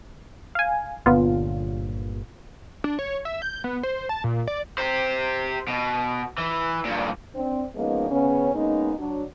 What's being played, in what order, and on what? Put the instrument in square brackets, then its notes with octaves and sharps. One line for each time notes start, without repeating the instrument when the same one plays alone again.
[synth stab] F5 G#5
[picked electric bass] G1 A#2 D3 [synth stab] B3 F4
[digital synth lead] D4
C#5
E5
G6
B3
C5
A5
A#2
D5
[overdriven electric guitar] G4 C5
B2
E3
G2 A#2
[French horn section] C4 D4
F3 G#3 A#3 B3 C#4 D#4
C#3 B3 C#4
G#3 A#3 B3 C#4 D#4
F#3 D4